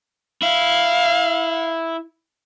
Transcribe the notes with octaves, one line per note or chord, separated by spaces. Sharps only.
E4 F5